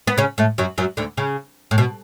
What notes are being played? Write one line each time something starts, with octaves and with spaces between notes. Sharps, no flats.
B3
C#3 C#4
A2 A3
F#2 F#3
F#2 F#3
D2 D3
C#3
A2
B2